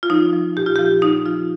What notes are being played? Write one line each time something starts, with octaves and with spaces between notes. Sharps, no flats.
F4
F3 D#4
F3
A#2 G4
F4
F3 G4
F3 D#4
F3 F4